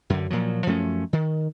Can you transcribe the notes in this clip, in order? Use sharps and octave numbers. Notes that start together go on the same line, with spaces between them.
F#2 D3
A#2 F3 F#3
F#2 F3 A3 C#4
D#3